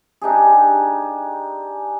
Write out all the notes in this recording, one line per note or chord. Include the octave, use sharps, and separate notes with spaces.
D4 D#4 G4 G#4